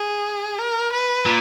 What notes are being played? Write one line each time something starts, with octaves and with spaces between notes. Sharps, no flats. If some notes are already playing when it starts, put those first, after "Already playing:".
Already playing: G#4
A#4
B4
A#2